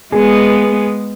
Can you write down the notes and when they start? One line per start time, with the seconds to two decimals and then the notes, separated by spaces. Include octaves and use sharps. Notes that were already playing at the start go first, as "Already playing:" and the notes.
0.12 G#3 B3 G#4